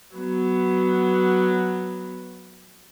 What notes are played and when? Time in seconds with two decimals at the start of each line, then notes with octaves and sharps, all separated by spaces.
0.16 F#3 B3